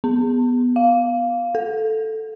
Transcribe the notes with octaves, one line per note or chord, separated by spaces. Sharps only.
B3
F5
A4